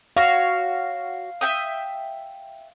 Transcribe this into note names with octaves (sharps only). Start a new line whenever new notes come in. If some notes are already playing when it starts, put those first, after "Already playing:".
F#4 C#5 F5
E5 G5 D#6